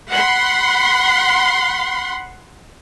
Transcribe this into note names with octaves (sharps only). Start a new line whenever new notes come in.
F#5 B5 C6